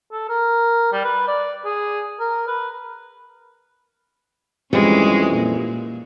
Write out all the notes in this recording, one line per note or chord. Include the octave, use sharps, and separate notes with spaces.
A4
A#4
G3
B4
D5
G#4
A#4
B4
F2 E3 G3 G#3 C#4
A#2